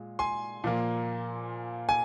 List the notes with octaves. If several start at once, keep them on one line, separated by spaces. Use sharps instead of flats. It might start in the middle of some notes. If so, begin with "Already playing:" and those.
Already playing: A#2 G#3
G#5 C6
A#2 F3 A#3
G#5